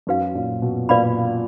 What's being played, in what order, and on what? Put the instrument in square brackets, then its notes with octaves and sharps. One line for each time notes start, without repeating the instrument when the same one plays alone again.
[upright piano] F#2 [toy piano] D#4 F#4 B4 F5
[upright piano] A#2
B2
[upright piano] A#2 [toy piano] B4 D5 F5 B5